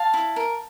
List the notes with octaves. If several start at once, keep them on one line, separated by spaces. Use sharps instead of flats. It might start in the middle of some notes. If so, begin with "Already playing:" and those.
Already playing: F5 A5
E4
A#4